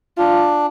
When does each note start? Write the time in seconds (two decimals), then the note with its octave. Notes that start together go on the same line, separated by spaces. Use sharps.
0.18 D4 F4